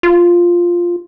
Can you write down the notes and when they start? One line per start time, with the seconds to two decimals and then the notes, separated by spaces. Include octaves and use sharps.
0.03 F4